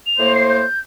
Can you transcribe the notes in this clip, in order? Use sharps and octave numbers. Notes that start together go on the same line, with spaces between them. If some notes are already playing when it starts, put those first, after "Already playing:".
F7
A2 A#3 C5
C7
G6